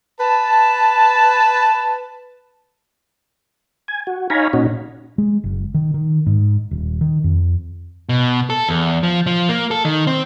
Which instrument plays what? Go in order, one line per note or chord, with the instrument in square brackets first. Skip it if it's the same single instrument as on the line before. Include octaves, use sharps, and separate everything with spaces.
[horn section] B4 A5
[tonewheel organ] G#5
F#4
D#4 C#5 F5 G#5 A#5 B5
A#2 C#4 D#4 F#4
[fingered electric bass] G#3
F#1
D#3
D#3
G#2
D#1
D#3
F2
[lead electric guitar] B2
A4
E2
F3
F3
A#3
A4
D#3
C4